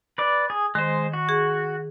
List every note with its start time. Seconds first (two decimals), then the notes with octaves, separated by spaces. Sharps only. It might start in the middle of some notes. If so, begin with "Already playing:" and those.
0.18 B4 D5
0.50 G#4
0.75 D#3 G#3 C5
1.13 F#4
1.29 G#4